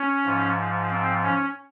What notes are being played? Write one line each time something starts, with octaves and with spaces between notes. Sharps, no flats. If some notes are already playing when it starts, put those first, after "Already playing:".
Already playing: C#4
G#2 F3
C4
C#4